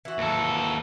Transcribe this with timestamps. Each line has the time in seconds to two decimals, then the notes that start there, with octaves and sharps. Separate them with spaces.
0.05 E3 F#4
0.18 D#2 A4